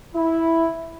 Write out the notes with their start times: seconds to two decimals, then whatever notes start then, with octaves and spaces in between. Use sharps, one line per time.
0.15 E4